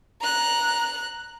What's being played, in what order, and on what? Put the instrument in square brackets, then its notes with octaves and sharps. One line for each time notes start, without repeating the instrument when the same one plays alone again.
[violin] A#5 F#6